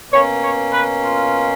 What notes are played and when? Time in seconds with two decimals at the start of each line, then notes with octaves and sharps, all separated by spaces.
0.11 B2 A#3 C#4 C#5
0.42 C#5
0.73 B4
1.03 F4